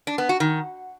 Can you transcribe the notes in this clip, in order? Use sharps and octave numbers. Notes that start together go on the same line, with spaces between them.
D4
B3
F#4
D#3